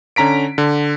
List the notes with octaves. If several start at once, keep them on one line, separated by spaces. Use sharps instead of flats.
D3 C#4 A#5 B6 D7
D3